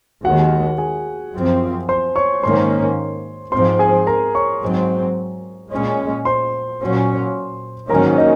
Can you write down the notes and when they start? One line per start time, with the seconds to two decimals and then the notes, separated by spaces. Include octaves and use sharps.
0.24 D#2 D#3 G#3 F#4 F#5
0.78 G#4 G#5
1.34 F#2 F3 C4
1.89 C5 C6
2.16 C#5 C#6
2.43 G#2 D#3 A#3 C#4 C5 C6
3.52 G#2 F3 C4 C5 C6
3.79 G#4 G#5
4.07 A#4 A#5
4.35 C#5 C#6
4.62 G#2 F#3 C4
5.71 A#2 G#3 C#4
6.25 C5 C6
6.81 A#2 F#3 C#4
7.90 G#2 D#3 F#3 A#3 C#4 A#4 A#5
8.18 D#4 D#5